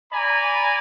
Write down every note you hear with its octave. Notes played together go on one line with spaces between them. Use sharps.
D5 G#5 A#5 B5